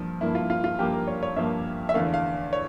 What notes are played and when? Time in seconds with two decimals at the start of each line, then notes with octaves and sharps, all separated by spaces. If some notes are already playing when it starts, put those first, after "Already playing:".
Already playing: G2 F3 A#3
0.21 G2 F3 A#3 E4
0.35 F4
0.50 F4
0.64 F4
0.79 G2 F3 A#3 G4
0.93 A#4
1.07 C#5
1.23 C#5
1.36 G2 F3 A#3 E5
1.89 E5
1.94 E2 D3 A3 F5
2.14 F5
2.53 C#5